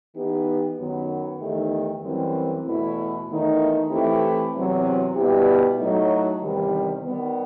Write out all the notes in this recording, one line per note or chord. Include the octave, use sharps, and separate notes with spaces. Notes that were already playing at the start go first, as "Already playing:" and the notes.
E3 B3 D#4 G4
F#2 D#3 F#3 B3
E2 D#3 A3 D#4 G4
F#2 E3 G3 C4
E2 B2 A3 E4
E2 D#3 A3 D#4
E3 A3 C4 E4 G4
E2 C3 F#3 C4
B2 G3 B3 E4 G4
A2 F#3 A3 D#4
E2 C3 D#3 G3
D#3 G3 B3